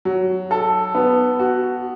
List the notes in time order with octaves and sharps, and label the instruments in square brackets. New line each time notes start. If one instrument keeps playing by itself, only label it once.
[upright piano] F#3
A4
B3
F#4